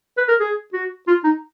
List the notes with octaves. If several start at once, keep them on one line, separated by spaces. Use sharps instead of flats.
B4
A#4
G#4
F#4
F4
D#4